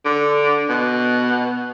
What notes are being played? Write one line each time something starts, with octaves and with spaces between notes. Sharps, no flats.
D3
B2